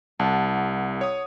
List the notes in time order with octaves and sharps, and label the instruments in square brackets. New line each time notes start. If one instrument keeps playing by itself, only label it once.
[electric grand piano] C2 [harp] F#5 A5
[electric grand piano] C#5 D#6